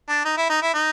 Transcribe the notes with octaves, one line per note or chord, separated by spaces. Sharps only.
D4
D#4
E4
D#4
E4
D#4